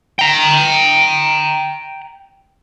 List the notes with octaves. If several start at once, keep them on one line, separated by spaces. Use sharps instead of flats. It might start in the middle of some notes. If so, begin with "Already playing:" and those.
G5 A#5